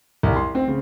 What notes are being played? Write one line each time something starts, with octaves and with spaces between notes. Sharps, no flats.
C2
C6
C4
C#3